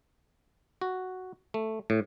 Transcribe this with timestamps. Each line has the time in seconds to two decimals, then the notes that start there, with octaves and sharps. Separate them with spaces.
0.82 F#4
1.54 A3
1.90 A2